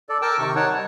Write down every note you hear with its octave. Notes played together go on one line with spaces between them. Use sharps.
A4 D5
A#4 G5 A5 D6 E6
C3 D#3 C#6
D#4 C#5 F#5 A5
G3